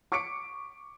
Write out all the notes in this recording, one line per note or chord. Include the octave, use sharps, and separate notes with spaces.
C#6 D6 B6 C#7 D7